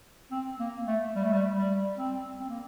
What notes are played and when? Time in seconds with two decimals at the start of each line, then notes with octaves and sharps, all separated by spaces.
0.31 C4
0.60 A#3
0.87 A3
1.15 G3
1.24 A3
1.33 G3
1.57 G3
1.98 C4
2.40 C4
2.50 A#3